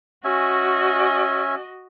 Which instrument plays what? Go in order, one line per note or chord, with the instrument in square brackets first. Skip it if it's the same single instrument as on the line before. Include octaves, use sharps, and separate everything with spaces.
[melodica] C#4 E5 G#5 [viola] F#4 D#5